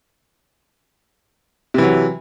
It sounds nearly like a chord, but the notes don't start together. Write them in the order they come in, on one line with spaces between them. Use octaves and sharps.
C3 E3 F#3